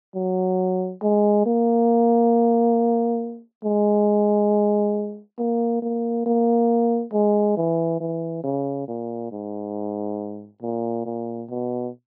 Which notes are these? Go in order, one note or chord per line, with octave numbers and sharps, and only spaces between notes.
F#3
G#3
A#3
G#3
A#3
A#3
A#3
G#3
E3
E3
C#3
A#2
G#2
A#2
A#2
B2